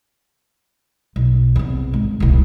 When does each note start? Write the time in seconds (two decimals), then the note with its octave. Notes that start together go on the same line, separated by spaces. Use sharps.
1.16 B1
1.56 E2 C3
1.94 G#1
2.20 D#1 C2